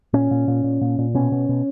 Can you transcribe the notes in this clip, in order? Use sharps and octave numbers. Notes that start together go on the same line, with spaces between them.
A#2 C#4
A#2
A#2
A#2
A#2
A#2
B2 C#4
B2
B2